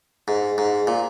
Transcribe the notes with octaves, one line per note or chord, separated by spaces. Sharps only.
G#2
G#2
A#2